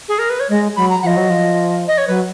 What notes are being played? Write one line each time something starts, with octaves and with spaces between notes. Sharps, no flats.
G#4
A#4
B4
C#5
G#3 D#5
F#3 B5
A#5
F3 D#5 F#5
F#3
F3
D#5
C#5
F#3 B4